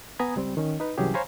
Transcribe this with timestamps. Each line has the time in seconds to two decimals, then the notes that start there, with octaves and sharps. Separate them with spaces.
0.19 B3 G#5 A#5 B5 D#6 G#6
0.36 C#2 G3 C4
0.57 D#3 C#4
0.80 D#4 B4
0.98 C2 E3 F#3 C#4 G4 G#4
1.14 C5 C#5 F5 G#5 A#5 B5